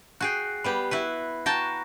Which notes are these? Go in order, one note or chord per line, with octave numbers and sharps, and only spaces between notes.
F#4 G#4 G5 F#6 C7
G3 B3 G4 B5
E4 F#4 B4 F#6
F#4 G5 A5 A#5 C#6 A#6